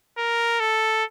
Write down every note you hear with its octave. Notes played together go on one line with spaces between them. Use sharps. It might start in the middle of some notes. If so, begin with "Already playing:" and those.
A#4
A4